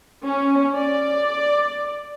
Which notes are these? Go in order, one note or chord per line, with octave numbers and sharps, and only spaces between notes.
C#4
D5